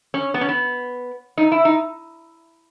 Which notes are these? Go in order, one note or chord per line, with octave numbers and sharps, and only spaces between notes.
C#4
B3
C#4
B3
D#4
E4
D#4